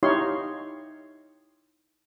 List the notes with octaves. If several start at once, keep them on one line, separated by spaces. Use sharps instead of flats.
D#4 E4 G4 C#5 F5 C6